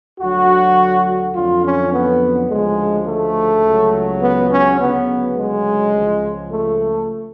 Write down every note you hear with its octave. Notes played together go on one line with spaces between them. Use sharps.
D2 D3 F#3 F#4
F2 D3 F#3 F4
C#4
B3
D2 C#3 F3 G#3
A3
C#2 C#3 F#3
B3
C#4
D2 C#3 F#3 B3
G#3
C#2 C#3 F3
A3